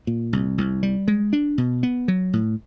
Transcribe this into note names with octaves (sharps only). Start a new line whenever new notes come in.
A#2
C2
C2
G3
G#3
D4
B2
B3
F#3
A2